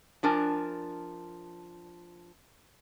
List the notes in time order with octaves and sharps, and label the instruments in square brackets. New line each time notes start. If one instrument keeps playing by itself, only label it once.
[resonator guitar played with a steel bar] F3 D4 A#4 G#5 A5